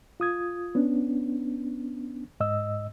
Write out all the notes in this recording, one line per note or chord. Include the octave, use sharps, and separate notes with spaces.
F4 D#6 G#6
B3 C#4 D4
G#2 D#5 E6